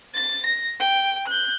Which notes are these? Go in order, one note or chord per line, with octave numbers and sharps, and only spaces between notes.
A6
A#6
G5
F#6 G6